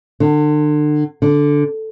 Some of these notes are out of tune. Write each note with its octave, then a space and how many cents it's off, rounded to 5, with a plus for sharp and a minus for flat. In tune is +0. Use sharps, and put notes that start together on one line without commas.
D3 +35
D3 -5